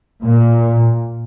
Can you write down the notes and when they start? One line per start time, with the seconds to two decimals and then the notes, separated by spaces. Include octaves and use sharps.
0.24 A#2